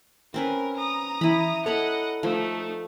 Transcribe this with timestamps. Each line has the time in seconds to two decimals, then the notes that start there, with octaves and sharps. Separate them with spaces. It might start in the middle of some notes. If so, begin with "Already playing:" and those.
0.34 C4 C#4 A#4 B4
0.77 A#5 D#6
1.21 E3 E4 B5
1.66 A4 C#5 D#5 F#5 A#5 B5
2.23 F3 A3 D#4